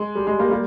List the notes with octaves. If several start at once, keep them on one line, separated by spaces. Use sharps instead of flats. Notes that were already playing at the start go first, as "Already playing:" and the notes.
Already playing: G#3
G3
G#3
G3 A#3
G3 A#3